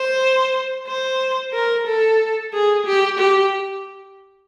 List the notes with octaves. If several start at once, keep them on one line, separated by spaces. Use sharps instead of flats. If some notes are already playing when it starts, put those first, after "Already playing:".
Already playing: C5
C5
A#4
A4
G#4
G4
G4